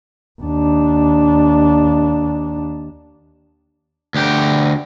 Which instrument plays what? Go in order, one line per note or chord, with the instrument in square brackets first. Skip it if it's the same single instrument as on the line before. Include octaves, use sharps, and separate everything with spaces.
[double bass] D#2 D4
[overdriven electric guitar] D2 G4